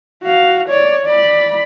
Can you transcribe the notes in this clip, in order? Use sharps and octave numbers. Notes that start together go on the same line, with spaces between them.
F#4 F5
C#5 D5
D5 B5